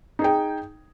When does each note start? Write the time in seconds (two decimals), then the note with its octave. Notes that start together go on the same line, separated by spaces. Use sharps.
0.19 D#4
0.22 G#4
0.24 G5